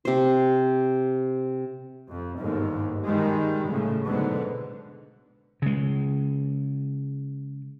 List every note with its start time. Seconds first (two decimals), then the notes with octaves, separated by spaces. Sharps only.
0.05 C3 C5
2.10 F2
2.39 G1 D#2 G#2
3.05 D#3 G3 G#3
3.68 A2 C#3
4.05 B1 G#2 D3 B3
5.62 C#3 G#3